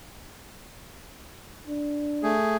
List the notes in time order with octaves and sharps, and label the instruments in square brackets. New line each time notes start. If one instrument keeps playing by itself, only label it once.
[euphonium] D4
[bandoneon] A3 G#4